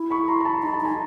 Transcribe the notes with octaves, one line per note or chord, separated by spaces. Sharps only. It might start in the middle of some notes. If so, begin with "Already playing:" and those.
Already playing: E4
B5 C#6
A#5 C6
A#5
A5 B5
D#4 A#5
A5
D#4 G#5 A#5